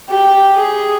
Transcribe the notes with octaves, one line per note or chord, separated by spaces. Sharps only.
G4
G#4